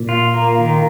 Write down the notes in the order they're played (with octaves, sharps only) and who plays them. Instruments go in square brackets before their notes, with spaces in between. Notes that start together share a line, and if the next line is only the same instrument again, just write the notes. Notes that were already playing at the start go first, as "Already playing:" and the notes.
Already playing: [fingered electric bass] A#2
[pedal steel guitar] F4
A#3
D#3